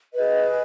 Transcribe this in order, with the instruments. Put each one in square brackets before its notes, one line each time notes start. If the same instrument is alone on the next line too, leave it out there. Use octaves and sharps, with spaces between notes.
[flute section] G#4 B4 D#5